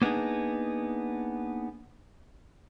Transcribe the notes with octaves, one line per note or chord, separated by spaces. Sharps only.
A#3 B3 D4 D#4 G#4